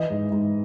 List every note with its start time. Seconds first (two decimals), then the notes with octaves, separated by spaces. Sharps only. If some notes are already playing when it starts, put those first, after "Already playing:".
Already playing: E3 D#5
0.10 G#2
0.32 G#2